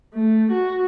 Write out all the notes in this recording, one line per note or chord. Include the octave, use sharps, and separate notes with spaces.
A3
F#4